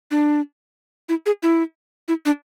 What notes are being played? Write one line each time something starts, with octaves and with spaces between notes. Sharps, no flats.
D4
E4
G#4
E4
E4
D4